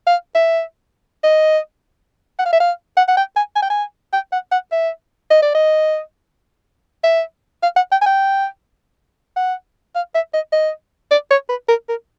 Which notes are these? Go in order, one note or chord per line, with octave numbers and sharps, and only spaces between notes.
F5
E5
D#5
F#5
F5
E5
F5
F#5
F#5
G5
G#5
G#5
G5
G#5
G5
F#5
F#5
E5
D#5
D5
D#5
E5
F5
F#5
G5
G#5
G5
F#5
F5
E5
D#5
D#5
D5
C#5
B4
A#4
A#4